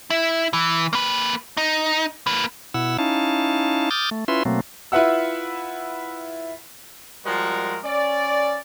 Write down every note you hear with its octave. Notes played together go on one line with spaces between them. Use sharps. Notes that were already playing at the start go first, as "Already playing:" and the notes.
E4
E3
A#3 B4
D#4
A#3 B4
B2 E4 F#5 E6
C#4 D#4 E4 F5 A5
D6 D#6 F6 G6 A6
A3
C#4 E4 F4 B4 E5 C6
B2 F#3 A3 A#3 C4
E4 F4 B4 E5 F#5 E6
F3 G3 G#3 F#4 A#4
C#4 D5